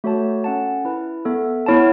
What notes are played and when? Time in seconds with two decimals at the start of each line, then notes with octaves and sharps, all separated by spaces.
0.04 A3 F#4 A4 C#5 A5
0.44 C#4 A4 F#5 A5
0.85 E4 B4 A5
1.25 B3 A4 E5
1.66 B3 E4 C#5 A5